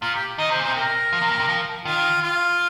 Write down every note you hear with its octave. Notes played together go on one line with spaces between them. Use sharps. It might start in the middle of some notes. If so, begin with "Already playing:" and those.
A#2 F4
G4
D#3 D#5
C3 C5
A#2 C5
C3
A#4
F3
C3
A#2
C3
F3
D#3 F4
F4